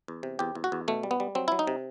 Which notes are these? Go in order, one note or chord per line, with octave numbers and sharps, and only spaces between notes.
E2
C3
E2 G4
E2
F#4
E2
B2 A3
G3
B3
G3
F#3 C4
F#3 E4
D#4
C3